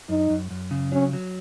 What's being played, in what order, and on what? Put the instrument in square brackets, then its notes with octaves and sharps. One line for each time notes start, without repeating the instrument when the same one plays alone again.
[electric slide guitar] F#2 [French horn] D#4
[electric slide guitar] F#2
F#2
C#3
[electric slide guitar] F#3 [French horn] C#4
[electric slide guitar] F#3